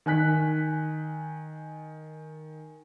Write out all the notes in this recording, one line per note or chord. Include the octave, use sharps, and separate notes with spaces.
D#3 G#5 F#6 B6